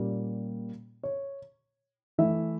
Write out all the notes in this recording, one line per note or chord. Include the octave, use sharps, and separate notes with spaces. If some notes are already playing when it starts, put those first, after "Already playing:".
Already playing: A#2 G3 A#3 C#4
C#5
E3 A3 E4 E5